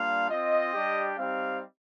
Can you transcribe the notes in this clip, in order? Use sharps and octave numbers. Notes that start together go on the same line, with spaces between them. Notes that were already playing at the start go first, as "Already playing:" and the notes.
Already playing: G3 A#3 D4 F4 F5
C4 F4 D#5
G3 D4 G4
G3 C4 D#4 G4 F5